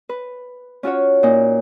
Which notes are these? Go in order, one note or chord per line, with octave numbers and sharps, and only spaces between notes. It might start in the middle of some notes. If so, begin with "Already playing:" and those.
B4
C#4 F4 F#4 C#5
A#2 D#4